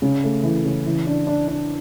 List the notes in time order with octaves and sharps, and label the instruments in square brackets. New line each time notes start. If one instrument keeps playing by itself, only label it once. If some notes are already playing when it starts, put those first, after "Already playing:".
[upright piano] C#3
A3
E3
C#3
E3
D4
D4
D4